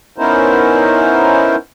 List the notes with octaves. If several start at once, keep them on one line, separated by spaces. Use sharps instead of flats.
B3 C#4 D#4 E4 A#4 C5